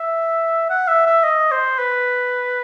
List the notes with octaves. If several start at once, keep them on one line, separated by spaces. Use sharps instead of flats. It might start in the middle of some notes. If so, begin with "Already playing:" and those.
Already playing: E5
F#5
E5
E5
D#5
C5
B4